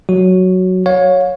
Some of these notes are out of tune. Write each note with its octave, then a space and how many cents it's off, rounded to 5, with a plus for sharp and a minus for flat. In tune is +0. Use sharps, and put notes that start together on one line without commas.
F#3 +0 F#4 +0
C#5 +0 F5 +35